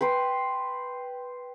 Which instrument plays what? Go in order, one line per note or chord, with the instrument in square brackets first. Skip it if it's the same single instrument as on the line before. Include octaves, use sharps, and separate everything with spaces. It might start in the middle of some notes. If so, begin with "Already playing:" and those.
[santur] B4 G5 C6